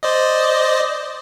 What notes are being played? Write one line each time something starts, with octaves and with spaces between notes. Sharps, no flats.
C5 D5 D#5